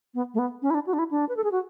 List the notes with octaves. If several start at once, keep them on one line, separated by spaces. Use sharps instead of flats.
B3
A3
B3
C#4
E4
D4
F#4
D4
E4
D4
B4
A4
G#4
F#4